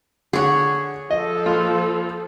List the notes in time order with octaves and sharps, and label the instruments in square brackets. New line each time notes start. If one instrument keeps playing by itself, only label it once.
[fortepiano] D3 F#5 [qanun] G#4 C#5
[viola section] F3 A4 [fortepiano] D#5
[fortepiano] A#1 F4